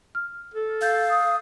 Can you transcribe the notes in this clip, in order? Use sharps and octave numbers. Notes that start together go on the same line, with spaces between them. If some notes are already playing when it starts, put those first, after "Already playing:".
F6
A4
F5 E6 G6 A6
D#6